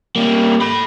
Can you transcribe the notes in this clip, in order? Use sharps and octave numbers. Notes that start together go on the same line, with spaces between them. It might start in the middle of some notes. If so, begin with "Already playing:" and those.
G3 A#3
A4 B5